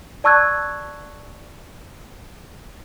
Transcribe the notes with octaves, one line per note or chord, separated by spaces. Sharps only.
D5 A5 C#6 E6 F#6 G#6